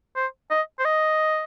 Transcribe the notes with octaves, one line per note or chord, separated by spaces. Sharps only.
C5
D#5
C5
D#5